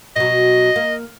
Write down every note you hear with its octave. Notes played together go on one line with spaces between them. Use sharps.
B2 F#3 D#5
A#3